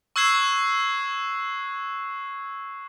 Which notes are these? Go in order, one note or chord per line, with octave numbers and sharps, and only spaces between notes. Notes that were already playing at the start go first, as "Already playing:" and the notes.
C#6 E6 F#6 G#6 C7 E7